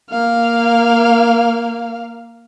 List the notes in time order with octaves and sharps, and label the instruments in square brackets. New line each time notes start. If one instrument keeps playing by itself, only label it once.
[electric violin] A#3 F5